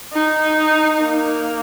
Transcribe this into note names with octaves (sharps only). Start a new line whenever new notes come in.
D#4
A#3